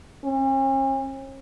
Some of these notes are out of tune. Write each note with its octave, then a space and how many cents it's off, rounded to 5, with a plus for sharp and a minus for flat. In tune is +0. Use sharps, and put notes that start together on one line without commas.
C#4 -45